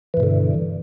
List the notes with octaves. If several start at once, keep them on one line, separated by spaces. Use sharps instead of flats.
G2 B2 D3 E3